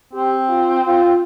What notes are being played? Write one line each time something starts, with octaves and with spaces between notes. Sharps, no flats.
C4 G4
F4
F4